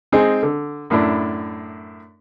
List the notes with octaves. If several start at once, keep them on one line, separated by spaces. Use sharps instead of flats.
G#3 C4 D#4 G#4
D3
F#2 A2 D4 E4